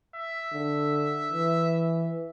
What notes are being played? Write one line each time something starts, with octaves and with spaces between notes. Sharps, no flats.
E5
D3
E3